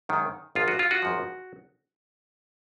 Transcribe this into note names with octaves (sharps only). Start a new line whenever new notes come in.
F#2 D#3 G#3
G#1 F#2 F3 F4
F#4
F4
F#4
G#1 F#2 F3